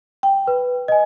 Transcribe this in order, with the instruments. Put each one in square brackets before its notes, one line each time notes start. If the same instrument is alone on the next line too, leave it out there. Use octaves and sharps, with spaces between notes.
[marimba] G5
[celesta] B4
D#5 G#5